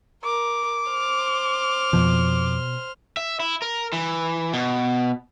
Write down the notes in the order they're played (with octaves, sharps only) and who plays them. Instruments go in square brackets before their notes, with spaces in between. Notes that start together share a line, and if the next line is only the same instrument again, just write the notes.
[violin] A#4 [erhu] D6
[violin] C5 F6
[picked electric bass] F2 F3 [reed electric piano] B2
[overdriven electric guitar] E5
E4
A#4
E3
B2